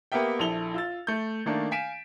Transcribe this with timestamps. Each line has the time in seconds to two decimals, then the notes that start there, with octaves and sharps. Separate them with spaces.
0.12 A#3 B3 G4 A#4 E5 G5
0.39 A#1 E4 A4 F7 G7
0.74 F4 E6 A6
1.07 A3 G6
1.46 D#3 A3 A#3 D4
1.71 F5 G#5 B6 D7 E7